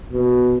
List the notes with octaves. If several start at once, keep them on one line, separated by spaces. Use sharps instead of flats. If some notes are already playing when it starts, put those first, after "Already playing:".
B2